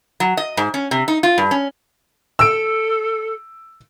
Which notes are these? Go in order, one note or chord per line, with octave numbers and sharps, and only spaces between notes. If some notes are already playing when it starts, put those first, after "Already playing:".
F#3
D#5
G#2
C#4
C3
D#4
F4
G2
C#4
A4 E6 D7